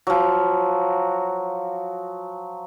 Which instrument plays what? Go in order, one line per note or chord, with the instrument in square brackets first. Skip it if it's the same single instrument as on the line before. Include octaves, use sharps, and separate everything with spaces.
[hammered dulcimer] F3 F#3